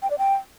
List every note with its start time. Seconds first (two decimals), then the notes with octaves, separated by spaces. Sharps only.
0.02 G5
0.10 D5
0.18 G5